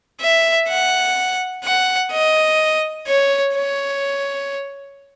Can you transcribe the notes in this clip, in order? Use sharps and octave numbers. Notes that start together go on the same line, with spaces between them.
E5
F#5
F#5
D#5
C#5
C#5